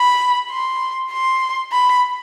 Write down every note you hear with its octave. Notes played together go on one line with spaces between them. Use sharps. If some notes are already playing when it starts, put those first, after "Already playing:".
Already playing: B5
C6
C6
B5